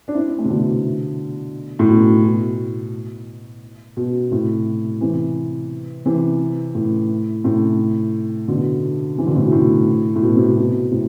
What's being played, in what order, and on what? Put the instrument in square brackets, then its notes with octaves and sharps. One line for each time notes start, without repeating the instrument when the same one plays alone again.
[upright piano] D4
C4 E4
A3 C4
C3
B2 D3
A2
B2
B2
B2
A2 C3
C3 E3
C3 E3
A2
A2 C3
B2 D3
C3 E3
B2 D3
A2 C3
B2
A2
A2
B2
C3
B2
B2
A2 C3